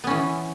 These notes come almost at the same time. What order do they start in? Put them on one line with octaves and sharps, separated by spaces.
B3 C#4 E3